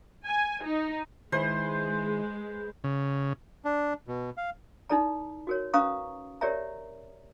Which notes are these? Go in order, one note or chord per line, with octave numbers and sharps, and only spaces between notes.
G#5
D#4
D#3 G#3 E4 G#4 B4 C5
C#3
D4
B2
F5
D#4 E4 A4 D5 A#5
F#4 A#4 C#5
C#4 B4 F5 A#5 C#6 D#6
G4 A#4 C#5 D5 E5 A#5